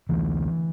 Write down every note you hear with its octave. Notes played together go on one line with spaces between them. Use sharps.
D2 E3